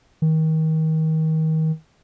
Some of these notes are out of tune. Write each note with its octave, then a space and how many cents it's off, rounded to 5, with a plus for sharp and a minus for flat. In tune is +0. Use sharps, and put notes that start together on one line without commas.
D#3 +30